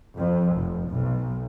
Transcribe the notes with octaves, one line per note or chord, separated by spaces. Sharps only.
F2
F1
B1